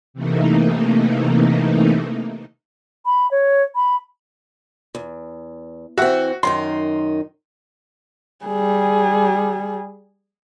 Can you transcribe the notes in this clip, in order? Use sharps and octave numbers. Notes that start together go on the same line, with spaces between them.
C3 E3 A3 A#3 D#4
B5
C#5
B5
E2
E3 C4 F#4 E5 F#5
F#2 D#3 D#4 C6
G3 G#4